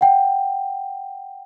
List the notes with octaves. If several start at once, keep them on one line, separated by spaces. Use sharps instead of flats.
F#5 G5